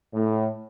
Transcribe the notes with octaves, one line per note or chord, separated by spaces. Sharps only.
A2